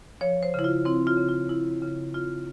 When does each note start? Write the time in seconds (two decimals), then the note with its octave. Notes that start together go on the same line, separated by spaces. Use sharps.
0.21 F3 C#5
0.43 C5
0.54 C#3 E4
0.64 F4
0.85 C4 E4
1.07 F4
1.17 C#3
1.29 F4
1.49 F3 E4
1.82 C#3
2.14 C4 F4